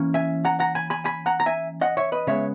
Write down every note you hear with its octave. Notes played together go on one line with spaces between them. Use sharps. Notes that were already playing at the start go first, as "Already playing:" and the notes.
Already playing: E3 A#3 C#4
E5 G#5
F#5 A#5
F#5 A#5
G#5 B5
G#5 B5
G#5 B5
F#5 A#5
A#5
E5 G#5
D#5 F#5
C#5 E5
B4 D#5
C#3 G#3 B3 C#5 E5